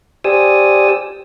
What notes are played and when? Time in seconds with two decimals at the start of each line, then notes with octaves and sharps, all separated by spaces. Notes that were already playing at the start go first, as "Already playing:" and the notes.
0.24 G4 C5 D5 G#5 D#6 E6